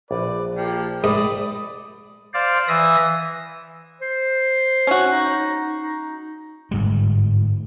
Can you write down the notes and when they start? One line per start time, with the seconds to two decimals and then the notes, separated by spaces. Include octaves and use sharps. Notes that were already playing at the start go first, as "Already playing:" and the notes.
0.11 A#1 B4 D5
0.55 F3 A#3 G4
1.04 G#2 D5 B5 D#6
2.34 C5 D5 F5
2.68 E3 E5 D#6 A#6
4.01 C5
4.87 C#4 F#4
5.10 D#4
5.80 D#4
6.71 G1 G#2 G3